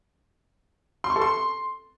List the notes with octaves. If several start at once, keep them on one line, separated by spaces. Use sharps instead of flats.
C6
C#6
A4
C6